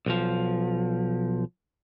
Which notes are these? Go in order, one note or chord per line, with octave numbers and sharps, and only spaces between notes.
B1 F3